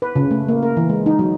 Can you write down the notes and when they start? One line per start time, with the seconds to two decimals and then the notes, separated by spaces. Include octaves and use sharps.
0.02 B4
0.16 C#3
0.31 A3
0.48 A#3
0.63 A#4
0.77 E3
0.90 G#3
1.06 D#4
1.19 F#3